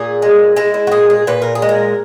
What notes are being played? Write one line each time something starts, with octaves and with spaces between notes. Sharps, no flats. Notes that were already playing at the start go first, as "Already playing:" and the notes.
Already playing: A#2 G#4
G#3
G#3 E4
E4
F#4
A#2 G#4
G#4
A#2 B4
A#4
G#4
G#3
A#4